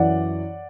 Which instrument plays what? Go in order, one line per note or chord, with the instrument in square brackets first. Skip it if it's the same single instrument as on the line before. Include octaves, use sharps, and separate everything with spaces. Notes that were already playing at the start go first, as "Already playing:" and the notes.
Already playing: [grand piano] F#2 E3 D5 F#5